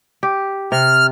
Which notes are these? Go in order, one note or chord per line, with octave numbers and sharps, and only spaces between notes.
G4
C3 F6